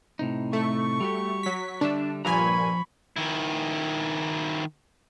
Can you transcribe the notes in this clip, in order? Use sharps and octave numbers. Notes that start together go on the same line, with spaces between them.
A2 C3 D#4
A3 C#6
G3 F#4 G4
F#3 B6
D3 G3 D4 E5
G2 A#2 F3 G#5 A#5 B5 C#6
D#3 E4